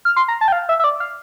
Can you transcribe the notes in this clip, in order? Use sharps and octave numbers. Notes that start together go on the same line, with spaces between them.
F6
C6
A#5
A5
G5
F5
E5
E5
D5
F5